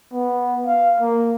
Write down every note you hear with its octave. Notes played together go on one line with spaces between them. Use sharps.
B3
F5
A#3